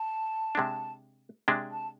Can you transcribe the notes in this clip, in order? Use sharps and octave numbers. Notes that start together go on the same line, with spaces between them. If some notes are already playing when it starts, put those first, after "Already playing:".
Already playing: A5
C3 G#3 D4
C3 G#3 D4
A5